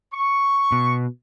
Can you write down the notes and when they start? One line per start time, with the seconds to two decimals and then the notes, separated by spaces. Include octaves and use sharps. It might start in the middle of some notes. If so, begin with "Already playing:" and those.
0.13 C#6
0.72 B2